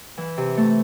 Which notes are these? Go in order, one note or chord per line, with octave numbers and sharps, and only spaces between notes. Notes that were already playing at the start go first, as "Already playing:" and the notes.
E3
C3
A3